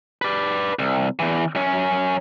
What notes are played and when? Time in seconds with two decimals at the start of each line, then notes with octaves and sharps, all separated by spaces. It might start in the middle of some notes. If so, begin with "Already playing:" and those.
0.22 B4 D5
0.79 C2
1.19 E2 E3
1.55 F#2 C#4